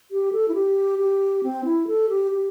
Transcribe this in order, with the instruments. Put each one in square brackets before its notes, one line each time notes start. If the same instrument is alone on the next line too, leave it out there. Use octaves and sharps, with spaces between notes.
[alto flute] G4
A4
E4
G4
G4
C4
E4
A4
G4
G4